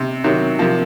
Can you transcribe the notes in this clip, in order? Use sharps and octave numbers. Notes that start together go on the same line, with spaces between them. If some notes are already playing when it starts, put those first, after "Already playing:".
Already playing: C3
C3 D#3 F#3
C3 F3 A#3